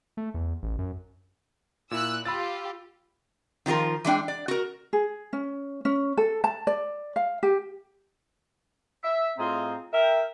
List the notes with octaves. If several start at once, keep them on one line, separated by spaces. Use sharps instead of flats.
A3
E2
A1
F#2
A#2 E4 E6 F#6
F4 G4 B5 E6 A6
D#3 F3 G3 F4 A#4
E3 G#3 D4 G5
D5
F#4 A#4
G#4
C#4
C#4
A4
A5
D5
F5
G4
E5
A2 C4 F4 G#4 D#5 A#5
A#4 E5 G5